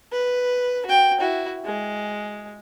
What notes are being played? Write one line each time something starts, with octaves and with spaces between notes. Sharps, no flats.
B4
F#4 G5
E4 F#4
G#3